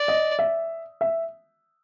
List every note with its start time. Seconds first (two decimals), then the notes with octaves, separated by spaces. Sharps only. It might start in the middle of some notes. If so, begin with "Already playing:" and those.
Already playing: D5
0.08 D#5
0.39 E5
1.01 E5